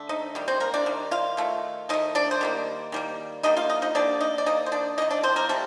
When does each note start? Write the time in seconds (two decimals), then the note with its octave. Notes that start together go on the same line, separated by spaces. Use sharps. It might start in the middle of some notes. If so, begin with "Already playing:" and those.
Already playing: D3 A3
0.09 D#4 D#5
0.35 D#3 G3
0.48 C4 C5
0.60 A#3 A#4
0.74 D4 D5
0.86 D#3 G3
1.11 F4 F5
1.37 D#3 A3
1.89 D#3 A3 D#4 D#5
2.15 D4 D5
2.31 C5
2.41 D#3 G3 A#3
2.92 D#3 G3 A#3
3.43 D3 G3 A#3 D#4 D#5
3.57 F4 F5
3.69 D#4 D#5
3.82 D#4 D#5
3.95 D3 G3 A#3 D4 D5
4.21 D#4 D#5
4.38 D5
4.46 D#3 A#3 D#4 D#5
4.66 C5
4.72 D4 D5
4.98 A#3 D#4 D#5
5.02 D#3
5.11 D4 D5
5.23 C4 C5
5.36 A#3 A#4
5.49 C3 G3 A3 A4